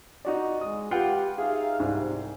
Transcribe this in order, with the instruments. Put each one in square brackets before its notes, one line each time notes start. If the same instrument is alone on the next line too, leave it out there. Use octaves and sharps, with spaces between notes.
[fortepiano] D#4 F#4 D5
[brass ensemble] G#3 [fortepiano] D#6
[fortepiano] F4 F#5 G5 [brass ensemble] G4 B4
[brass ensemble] D#4 E5 F5 [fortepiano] G#4
[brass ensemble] C2 [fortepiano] G#2